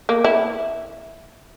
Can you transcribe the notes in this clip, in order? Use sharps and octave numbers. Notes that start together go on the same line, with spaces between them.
A#3
E4